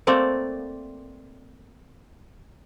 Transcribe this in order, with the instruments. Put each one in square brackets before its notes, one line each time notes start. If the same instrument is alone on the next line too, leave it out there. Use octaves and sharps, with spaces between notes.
[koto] A3 A#3 C4 D5